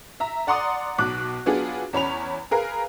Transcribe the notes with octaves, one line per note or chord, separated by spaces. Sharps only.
E5 A#5
D5 F#5 A#5 C6 D6 D#6
B1 B2 D6 F#6
F#3 B3 D4 F4 G#4
E2 C#4 B5 F7
G#4 A#4 B4 F5